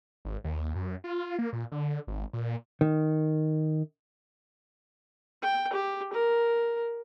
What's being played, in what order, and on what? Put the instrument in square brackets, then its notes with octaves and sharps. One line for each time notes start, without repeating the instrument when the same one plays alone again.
[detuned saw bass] G#1
D#2
F#2
F4
A#3
A#2
D3
G#1
A#2
[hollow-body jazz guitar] D#3
[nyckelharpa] G5
G4
A#4